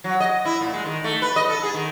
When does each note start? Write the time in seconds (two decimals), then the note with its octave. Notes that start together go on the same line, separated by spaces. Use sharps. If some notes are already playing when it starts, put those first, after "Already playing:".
0.04 F#3
0.20 D#5
0.45 E4
0.61 A#2
0.74 G#3
0.85 D#3
1.04 A3
1.22 B4
1.36 D#5
1.49 A4
1.63 G#4
1.74 D#3